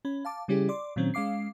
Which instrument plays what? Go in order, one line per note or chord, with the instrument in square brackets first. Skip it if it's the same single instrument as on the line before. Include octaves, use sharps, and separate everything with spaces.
[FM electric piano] C#4 B5
F5 A5 D6
C#3 G3 C#4 E4 G4 G#4
D5 C6 D6
A#2 D#3 F#3 C4 C#4
G#3 C#4 F5 D6 C7